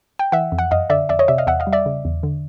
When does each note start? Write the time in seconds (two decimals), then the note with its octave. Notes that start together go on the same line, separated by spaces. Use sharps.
0.19 G5
0.32 E3 E5 F#5
0.52 F2
0.59 F#5
0.71 F#2 D#5 F5
0.90 D3 D5 E5
1.09 F2 D5 E5
1.19 C#5 D#5
1.28 C3 D5 E5
1.38 D#5 F5
1.47 E2 E5 F#5
1.60 D#5 F5
1.67 G3
1.72 D5 E5
1.86 C#3
2.05 E2
2.23 D3